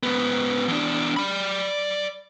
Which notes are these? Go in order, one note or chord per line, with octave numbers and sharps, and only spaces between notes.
G#2 B3
E2 D4
D5 B5